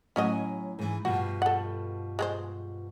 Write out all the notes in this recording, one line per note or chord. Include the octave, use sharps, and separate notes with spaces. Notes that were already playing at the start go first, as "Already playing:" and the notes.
A2 F#3 C#4 F#4 D#5 G#5
G#2 E3
G2 B2 F3 F#4
A4 F#5
G#3 G#4 C5